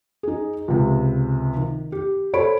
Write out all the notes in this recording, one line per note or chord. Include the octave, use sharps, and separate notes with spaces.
D#4 G#4
C#2 C3
D#3
G4
F#4 A4 C5 C#5 B5 D7